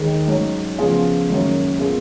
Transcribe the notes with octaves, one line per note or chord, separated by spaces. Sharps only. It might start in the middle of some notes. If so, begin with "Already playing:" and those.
Already playing: D#2 D#3 G#3
G#2 F#3 C#4
C#3 F3 B3 F4 G#4
G#1 F#2 C#3 F#3 A#3
A#2 G#3 B3 F4